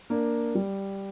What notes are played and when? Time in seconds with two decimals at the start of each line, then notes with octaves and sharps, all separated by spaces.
0.10 A#3 D4
0.55 G3